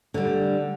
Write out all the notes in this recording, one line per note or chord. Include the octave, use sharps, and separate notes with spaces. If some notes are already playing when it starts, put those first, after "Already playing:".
D3 G3